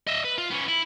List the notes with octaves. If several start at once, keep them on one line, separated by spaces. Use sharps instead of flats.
D#5 E5
B4
F4
B3 C#4
E4